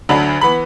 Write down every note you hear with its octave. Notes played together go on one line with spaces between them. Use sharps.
D2 D3 F#3 D4 B5
E3 B3 B5